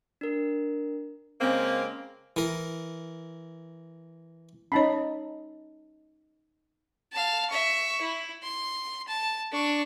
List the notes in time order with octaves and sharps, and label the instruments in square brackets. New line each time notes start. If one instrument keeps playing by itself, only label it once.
[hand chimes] D4 A#4
[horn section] C#3 G#3 A#3 C4
[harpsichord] E3 A#4
[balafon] C#4 C#5 [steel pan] D#4 A5 B5
[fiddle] F5 A5
E5 C#6
E4
C6
A5
D4 C#6